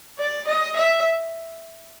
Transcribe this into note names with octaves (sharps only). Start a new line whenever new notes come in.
D5
D#5
E5